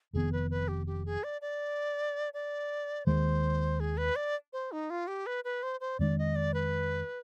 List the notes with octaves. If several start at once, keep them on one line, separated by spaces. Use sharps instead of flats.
F1 F2 D#3 B3 G#4
B4
B4
G4
G4
G#4
D5
D5
D5
D#2 D#3 G#3 C5
G#4
B4
D5
C5
D#4
F4
G4
B4
B4
C5
C5
F2 D#3 G#3 D4 D5
D#5
D5
B4